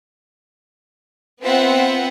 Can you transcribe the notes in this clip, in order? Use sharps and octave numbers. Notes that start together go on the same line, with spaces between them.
B3 C4 F4 B4 E5 F#5